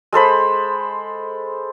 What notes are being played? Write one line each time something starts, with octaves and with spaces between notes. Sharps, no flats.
G#3 A4 C5 B5